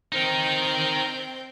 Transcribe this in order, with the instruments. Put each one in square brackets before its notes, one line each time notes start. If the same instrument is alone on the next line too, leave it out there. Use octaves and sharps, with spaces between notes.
[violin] C4 G5 [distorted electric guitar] D#4 A#4